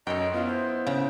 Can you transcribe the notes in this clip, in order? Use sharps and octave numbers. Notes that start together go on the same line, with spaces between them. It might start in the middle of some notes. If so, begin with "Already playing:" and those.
F#2 A4 C#5 D#5 G5
B3 E4 F4
C5
C#3